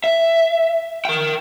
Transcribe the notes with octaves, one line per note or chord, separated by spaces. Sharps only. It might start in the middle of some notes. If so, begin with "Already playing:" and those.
E5
A#4 G5